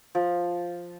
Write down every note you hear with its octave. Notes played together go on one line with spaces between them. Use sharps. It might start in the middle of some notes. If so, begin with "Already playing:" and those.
F3